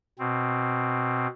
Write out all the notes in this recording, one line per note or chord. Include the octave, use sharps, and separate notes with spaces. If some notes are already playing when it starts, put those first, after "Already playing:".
B2 C4